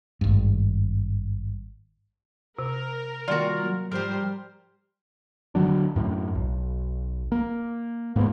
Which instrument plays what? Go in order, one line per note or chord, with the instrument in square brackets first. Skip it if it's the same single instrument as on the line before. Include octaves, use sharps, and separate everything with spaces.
[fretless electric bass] G#1 G2
[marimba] C3 [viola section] A#4
[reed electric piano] D#3 G3 A#3 [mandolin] F4 F#4 [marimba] D5 G5
[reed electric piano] F#3 A#3
[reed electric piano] G#2 F3 [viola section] G3 C5 [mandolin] G4 A#4
[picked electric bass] D3 D#3 F#3 D4
F#2 A2
B1
A#3
G#2 A#3 B3